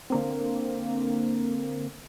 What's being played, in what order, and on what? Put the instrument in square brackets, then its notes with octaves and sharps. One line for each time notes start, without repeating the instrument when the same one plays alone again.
[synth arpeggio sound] D3 A#3 C4